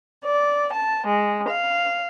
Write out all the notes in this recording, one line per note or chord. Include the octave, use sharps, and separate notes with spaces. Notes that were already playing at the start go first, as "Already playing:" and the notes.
D5
A5
G#3
F5